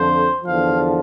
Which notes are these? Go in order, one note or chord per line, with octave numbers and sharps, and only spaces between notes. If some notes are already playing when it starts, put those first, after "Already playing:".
Already playing: F2 D3 F3 C5
E2 D3 F3 F5